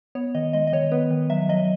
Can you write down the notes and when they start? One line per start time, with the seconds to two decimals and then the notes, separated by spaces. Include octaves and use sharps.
0.15 B3 C#5
0.35 D#3 D#5
0.53 G#3 D#5
0.67 D#5
0.73 D#3 C#5
0.91 B3 B4
1.10 D#3
1.30 F#3 E5
1.49 F#3 D#5